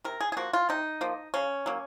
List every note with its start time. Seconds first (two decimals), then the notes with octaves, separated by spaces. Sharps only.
0.04 C3 A#4
0.21 G#4
0.32 G#4
0.37 F3 A#3 F#4
0.53 F4
0.69 C3 D#4
1.01 F3 A#3
1.34 C#3 C#4
1.66 F#3 A#3